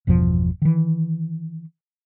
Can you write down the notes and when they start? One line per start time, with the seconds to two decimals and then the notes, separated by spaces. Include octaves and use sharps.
0.07 G1 E2 B2 F3
0.62 D#3 E3